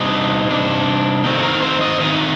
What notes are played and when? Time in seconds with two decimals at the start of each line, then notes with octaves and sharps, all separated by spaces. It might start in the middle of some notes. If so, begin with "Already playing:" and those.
Already playing: C3 G3 D4 D#4
0.47 C3 G3 D4
1.24 D#3 A3 C4 D#4
1.38 A4
1.43 A#4
1.62 C5
1.81 D#5
2.00 D#3 A3 C4 D#4 D#5